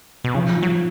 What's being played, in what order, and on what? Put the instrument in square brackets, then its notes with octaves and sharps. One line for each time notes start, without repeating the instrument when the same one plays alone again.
[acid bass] B2
[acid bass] C#3 [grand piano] F3
[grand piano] F3
[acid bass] F#3